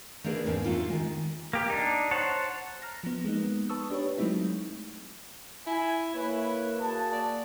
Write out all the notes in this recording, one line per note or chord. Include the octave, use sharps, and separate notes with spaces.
A3 A#3 D4 G#4 A#4 B4
E2 G#2 A#3 C#4 A5
F#3 A3 D4 F4
D#3 G#3
A#3 G4
D4 D#4
C5 C#5 F#5 A5
A#5 F6 A#6
F3 B3
G#3 A#3 B3 D#4
B4 A5 C#6 D#6 E6
D4 G4 B4 C#5
F#3 G#3 A3 C4 D#4 E4
E4 G#5
A#3 E4 B4 C#5
F#4 G#4 A5
D5